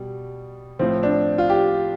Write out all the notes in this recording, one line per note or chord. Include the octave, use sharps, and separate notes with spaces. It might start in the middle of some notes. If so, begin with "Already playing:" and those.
Already playing: B2 G3
A2 F3 C4
D4
F4
G4